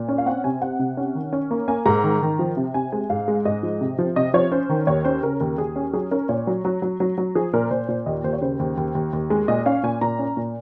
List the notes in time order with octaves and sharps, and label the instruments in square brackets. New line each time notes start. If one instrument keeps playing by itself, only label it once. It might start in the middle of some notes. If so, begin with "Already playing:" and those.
Already playing: [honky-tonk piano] A#2
C#4
F5
C4 F#5
C3 G#5
C4 F#5
C3
C#4
D#3
C#4
A#3
A#3 G#5
G#2 A#5
D#3
D#3
F3
C3
C3 G#5
G#3 G#5
G#2 F5
G#3
G#2 D#5
F3
C3
F3
C3 D#5
F3 C#5
C#4 C5
D#3
D#2 C#5
C#4 C5
C#3 A#4
D#2 A#4
D#2 G#4
C#4
F#3 G#4
C#4 A#4
A#2 C#5
F#3
F#3
F#3
F#3
F#3
F3 G#4
A#2 A#4
A#2 C5
A#2
D#2 D#5
D#2 C5
C#5
C#3 C5
D#2
D#2
D#2
D#2
G#3
A#2 D#5
C#4 F5
A#2 G#5
A#2 A#5
C#4
A#2